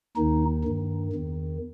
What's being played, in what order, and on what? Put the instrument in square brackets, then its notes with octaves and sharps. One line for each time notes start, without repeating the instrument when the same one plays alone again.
[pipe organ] D#2 D#3 D#4
G2 D#3
E2 D#3